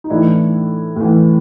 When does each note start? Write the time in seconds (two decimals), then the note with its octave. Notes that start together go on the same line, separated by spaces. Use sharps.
0.04 D#4
0.10 A2 E3 D4 E4
0.96 A2 E3